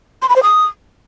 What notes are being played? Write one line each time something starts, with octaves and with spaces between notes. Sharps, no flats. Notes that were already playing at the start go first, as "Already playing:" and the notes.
C6
B5
C5
D#6